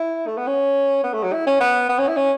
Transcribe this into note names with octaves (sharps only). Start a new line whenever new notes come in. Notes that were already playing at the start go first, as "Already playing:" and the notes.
Already playing: E4
A3
B3
C#4
B3
A3
F#3
E4
C#4
B3
B3
C#4
E4
C#4